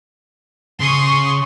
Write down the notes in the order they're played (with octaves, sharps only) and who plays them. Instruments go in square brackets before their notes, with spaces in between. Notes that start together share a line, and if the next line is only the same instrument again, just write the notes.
[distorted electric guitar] C#3 [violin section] C6 C#6 D#6